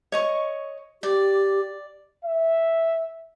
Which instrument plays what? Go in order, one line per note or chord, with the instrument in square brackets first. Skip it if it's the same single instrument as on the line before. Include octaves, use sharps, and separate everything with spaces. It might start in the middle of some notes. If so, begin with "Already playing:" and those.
[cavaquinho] C#5 D#5 C#6
[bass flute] G4 [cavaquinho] D5
[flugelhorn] E5